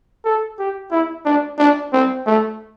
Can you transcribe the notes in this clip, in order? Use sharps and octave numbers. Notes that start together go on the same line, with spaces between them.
A4
G4
E4
D4
D4
C4
A3